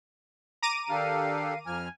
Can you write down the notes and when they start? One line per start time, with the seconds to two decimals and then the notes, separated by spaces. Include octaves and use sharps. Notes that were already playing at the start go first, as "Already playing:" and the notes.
0.62 A#5 D6 D#7
0.90 D#3 D4 G4 A4 F5
1.67 F2 F3 G#5 F6